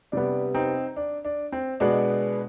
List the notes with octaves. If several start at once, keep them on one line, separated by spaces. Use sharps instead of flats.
C3 G3 B3 D4
C4 D#4
D4
D4
C4
B2 G#3 B3 D4